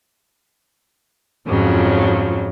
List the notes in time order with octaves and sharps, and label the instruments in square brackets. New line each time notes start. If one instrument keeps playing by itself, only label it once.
[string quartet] F2 G#2 C#3 F3 F#3